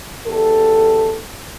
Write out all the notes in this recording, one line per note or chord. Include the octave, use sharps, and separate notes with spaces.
E2 G4 A4